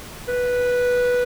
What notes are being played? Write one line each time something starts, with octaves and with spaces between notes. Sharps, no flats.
B4